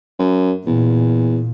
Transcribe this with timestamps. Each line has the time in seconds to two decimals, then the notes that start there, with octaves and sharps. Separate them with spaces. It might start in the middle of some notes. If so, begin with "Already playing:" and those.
0.19 F#2
0.66 E2 A#2